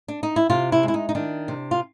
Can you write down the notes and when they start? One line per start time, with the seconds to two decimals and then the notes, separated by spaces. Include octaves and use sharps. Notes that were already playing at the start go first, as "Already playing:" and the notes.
0.08 D4
0.23 D#4
0.36 E4
0.50 C3 F4
0.72 E4
0.83 G#3
0.88 E4
0.94 D#4
1.09 D#4
1.15 D#3 D4
1.48 C3
1.71 F4